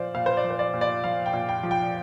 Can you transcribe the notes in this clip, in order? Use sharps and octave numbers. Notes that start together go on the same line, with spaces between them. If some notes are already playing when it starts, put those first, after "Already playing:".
Already playing: A#2 F3 C5 D5 F5
A#2 F5
C5
D5
F3
C5
D5
A#2
D5
F3 F5
G5
A#2
G5
F3
G5